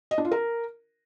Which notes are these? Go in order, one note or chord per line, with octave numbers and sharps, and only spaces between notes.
D#5
D4
F4
A#4